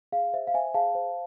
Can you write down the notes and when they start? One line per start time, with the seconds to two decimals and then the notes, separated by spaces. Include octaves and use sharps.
0.12 G#4 F5
0.34 C5 E5
0.47 F5
0.54 C5 E5 G#5
0.74 G#4 F5 A5
0.95 C5